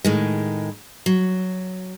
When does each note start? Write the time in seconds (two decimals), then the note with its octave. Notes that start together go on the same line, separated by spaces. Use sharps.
0.04 A2 D#3 G#3
1.06 F#3